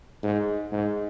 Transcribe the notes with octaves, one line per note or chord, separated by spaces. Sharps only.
G#2
G#2